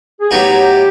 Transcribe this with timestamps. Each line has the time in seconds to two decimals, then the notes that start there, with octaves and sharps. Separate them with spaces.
0.20 G#4
0.31 A2 F#3 B3 D#4 F#4 G4